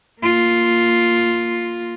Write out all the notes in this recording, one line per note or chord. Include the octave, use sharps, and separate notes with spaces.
A#3 F4